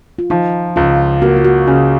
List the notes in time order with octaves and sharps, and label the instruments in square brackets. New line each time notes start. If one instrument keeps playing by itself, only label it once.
[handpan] F4
[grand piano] F3 [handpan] D#4
[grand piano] C#2 [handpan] F4
[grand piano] A#3 [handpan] F#4
[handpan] F4
F#4
[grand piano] C#3 [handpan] F#4